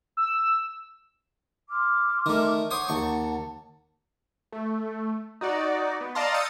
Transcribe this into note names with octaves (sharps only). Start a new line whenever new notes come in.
E6
C6 D6 F6
D#3 A3
C#5 F#5 C6 D6 D#6 G6
D#2 F#5 A5 C#6
A3
D#4 F#4 D5
B3
D5 D#5 F5 A5 A#5 C6
D#6 E6 G6 A6 C#7